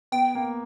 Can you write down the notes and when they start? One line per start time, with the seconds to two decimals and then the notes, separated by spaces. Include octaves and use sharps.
0.12 B3 G5
0.35 A#3